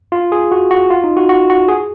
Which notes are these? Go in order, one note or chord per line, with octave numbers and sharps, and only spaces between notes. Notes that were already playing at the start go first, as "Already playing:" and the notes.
F4
G#4
F#4
F#4
F4
D#4
F#4
F#4
F#4
G#4